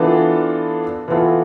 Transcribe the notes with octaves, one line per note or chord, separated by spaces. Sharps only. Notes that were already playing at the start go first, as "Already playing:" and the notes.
Already playing: E3 B3 D4 F4 A4
E3 B3 F4 A4